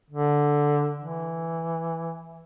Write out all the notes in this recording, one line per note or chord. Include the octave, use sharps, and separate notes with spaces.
D3
E3